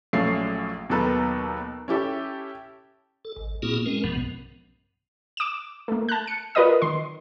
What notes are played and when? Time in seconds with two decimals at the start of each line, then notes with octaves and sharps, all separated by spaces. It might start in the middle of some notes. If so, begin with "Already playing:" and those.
0.13 A#1 F#3 A3 C#4 F5 C7
0.90 D#2 B2 F#3 A4 B4 A#5
1.88 C#4 E4 G4 A4
3.25 A4
3.36 G#1
3.62 A#2 A#3 C4 E4 F#4 G#4
3.86 G#3 C4 C#4 A#4
4.04 B1 G2 B2 F3 B3
5.37 D6 E7
5.88 A3 A#3
6.09 A5 F#6
6.27 C#7
6.55 F4 A#4 B4 D5 D#5 D#6
6.82 D#3 C6